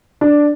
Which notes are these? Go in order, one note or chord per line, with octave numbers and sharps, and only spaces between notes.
D4